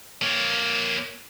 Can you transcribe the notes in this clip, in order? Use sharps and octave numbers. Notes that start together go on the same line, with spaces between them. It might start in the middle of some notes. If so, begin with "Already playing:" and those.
A#3 C#5